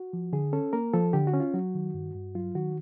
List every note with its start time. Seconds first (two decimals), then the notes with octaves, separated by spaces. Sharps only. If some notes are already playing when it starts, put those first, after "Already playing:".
Already playing: F#4
0.13 F3
0.33 D3 G#4
0.53 C#4 A4
0.73 A#3 A#4
0.93 F3 A4
1.13 D3 G4
1.27 F#4
1.33 C#4
1.40 F4
1.54 F#3 F#4
1.75 D#3
1.94 G2
2.15 G2
2.35 F#3 F4
2.55 D#3 F#4